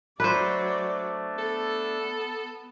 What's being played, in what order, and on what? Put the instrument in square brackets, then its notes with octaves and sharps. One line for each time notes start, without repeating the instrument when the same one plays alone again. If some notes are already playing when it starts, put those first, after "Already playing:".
[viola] F#3 D5 [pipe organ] A3 D4 [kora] B4 C5
[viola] B3 [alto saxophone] A4